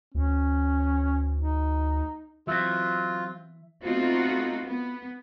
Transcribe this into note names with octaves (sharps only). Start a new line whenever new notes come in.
D2 C#4
D#4
E3 F#3 C4 F4 E5
A3 B3 C4 D#4 F4 F#4
B3